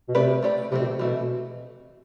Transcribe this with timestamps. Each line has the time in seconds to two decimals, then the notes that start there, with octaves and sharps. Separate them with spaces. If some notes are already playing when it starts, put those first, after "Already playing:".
0.08 B2
0.14 C3 A3 C4 G4 B4 D5
0.43 A3 C4 G4 B4 D5
0.72 C3 E3 A3 C4
0.80 B2
0.85 C3
0.99 B2 E3 A3 C4